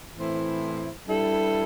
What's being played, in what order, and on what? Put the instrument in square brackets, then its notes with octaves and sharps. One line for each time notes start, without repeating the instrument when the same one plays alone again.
[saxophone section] A2 E3 C4 E4 C5
G2 G3 E4 A4